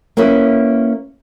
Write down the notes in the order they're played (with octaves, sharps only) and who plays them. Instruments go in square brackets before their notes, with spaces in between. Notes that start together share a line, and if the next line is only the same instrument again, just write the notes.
[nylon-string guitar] A#3 C#4 E4 B4 D#5